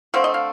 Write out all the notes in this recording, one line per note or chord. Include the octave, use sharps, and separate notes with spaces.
D3 A3 C4 F5
D#5
F5